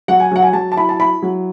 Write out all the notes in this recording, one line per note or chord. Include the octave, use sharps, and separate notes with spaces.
F#3 F#5
G#5
F#3 F#5
G#5
F#3 A5
A5
E4 B5
A5
E4 B5
F#3